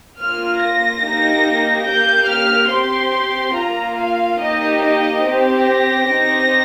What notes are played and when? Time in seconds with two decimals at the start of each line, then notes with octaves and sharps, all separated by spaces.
0.18 A#3 F4 F6
0.60 A#6
1.01 A#3 D#4 G4
1.85 A#3 G4 G6
2.27 F6
2.69 C4 G4 C6
3.54 A#3 F4 A#5
3.96 F5
4.38 A#3 D#4 G4 D#5
4.80 D#5
5.21 C4 G4
5.64 A#6
6.06 C4 D#4 G4